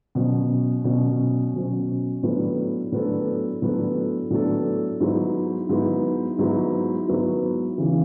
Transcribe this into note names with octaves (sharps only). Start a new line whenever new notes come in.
B2 F#3 C#4
B2 F#3 C#4
B2 F#3 C#4
A2 F#3 B3 D4 A4
A2 F#3 B3 D4 A4
A2 F#3 B3 D4 A4
A2 F#3 B3 D4 A4
G#2 F#3 B3 E4
G#2 F#3 B3 E4
G#2 F#3 B3 E4
G#2 F#3 B3 E4
C#3 E3